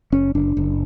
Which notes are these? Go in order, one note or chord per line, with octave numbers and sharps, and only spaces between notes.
F#1 C#4
F#1 D4
F#1